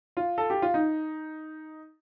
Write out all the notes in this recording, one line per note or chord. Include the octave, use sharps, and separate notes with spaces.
F4
A4
G4
F4
D#4